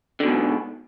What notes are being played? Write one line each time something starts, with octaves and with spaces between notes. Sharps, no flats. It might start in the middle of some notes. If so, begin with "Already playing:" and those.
G#2 B2 D3